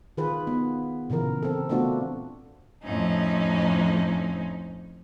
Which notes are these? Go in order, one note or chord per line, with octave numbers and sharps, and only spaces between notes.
D#3 F4 G#4 B4
B3
A#2 C#3 E3 A#4
C4 A4
A3 B3 C4 D4 F4 F#4
F2 A2 C#4 D#4